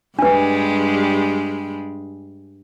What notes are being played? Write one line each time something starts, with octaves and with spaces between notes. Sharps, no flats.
G2 G3 G#3 D4 B4